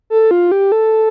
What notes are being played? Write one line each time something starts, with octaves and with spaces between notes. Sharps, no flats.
A4
F4
G4
A4